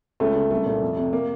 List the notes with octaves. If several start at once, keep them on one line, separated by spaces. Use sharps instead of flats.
C#2 A3
C#3
C2 A3
A#2
F2
C3
A#3